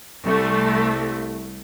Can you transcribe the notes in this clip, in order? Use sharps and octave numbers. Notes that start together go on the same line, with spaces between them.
C2 A3